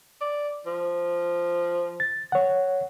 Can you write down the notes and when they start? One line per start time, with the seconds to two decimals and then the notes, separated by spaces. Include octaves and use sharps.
0.21 D5
0.66 F3
2.00 A6
2.32 C#5 F#5